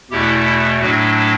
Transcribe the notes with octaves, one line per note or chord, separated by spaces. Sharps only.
E2 B2 A3 E4 G4
E4
A2 F#3 A3 D4 F#4